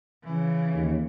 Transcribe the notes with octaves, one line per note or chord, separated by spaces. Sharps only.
C#3 E3
D#2